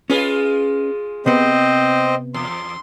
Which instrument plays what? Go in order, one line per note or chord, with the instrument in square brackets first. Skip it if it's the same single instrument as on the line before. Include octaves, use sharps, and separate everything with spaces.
[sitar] G#3 F4 G#4 [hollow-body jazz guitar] C#4 B4 D#5
[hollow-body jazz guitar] C3 B3 [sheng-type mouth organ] C4 C5 D#5
[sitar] E2 [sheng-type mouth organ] C6